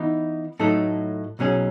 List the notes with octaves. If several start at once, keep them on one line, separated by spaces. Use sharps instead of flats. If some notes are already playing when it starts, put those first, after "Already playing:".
Already playing: E3 B3 D#4
A2 F#3 A3 D#4 A4
B1 B2 F#3 C#4 G#4